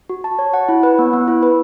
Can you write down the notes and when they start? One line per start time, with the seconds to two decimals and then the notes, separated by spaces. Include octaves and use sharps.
0.09 F#4
0.24 A5
0.39 C#5
0.54 F#5
0.69 E4
0.83 B4
0.99 B3
1.13 B3
1.28 E4
1.43 B4